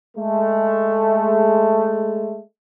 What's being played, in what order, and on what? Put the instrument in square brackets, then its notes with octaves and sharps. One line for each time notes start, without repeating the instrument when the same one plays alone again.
[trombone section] G#3 A3